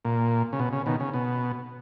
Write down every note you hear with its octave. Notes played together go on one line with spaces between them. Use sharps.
A#2
C#3
B2
C#3
B2 D#3
C#3
B2